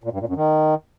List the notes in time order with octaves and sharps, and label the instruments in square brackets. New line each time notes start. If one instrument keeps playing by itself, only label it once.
[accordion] A#2
G2
A#2
F#2
D#3